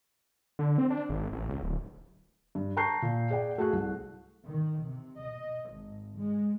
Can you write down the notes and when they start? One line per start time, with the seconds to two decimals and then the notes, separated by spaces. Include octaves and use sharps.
0.59 D3
0.78 C4
0.90 D4
1.09 G#1
1.32 A1
1.49 C#2
1.63 D1
2.55 G2
2.77 G5 A5 A#5 C#6 G6 C7
3.02 A#2
3.30 G#4 D5 F#5 G5
3.58 A3 F#4 G#4 F#6
3.73 C2
4.47 D#3
4.84 C3
5.21 D#5
5.71 G#1
6.17 G#3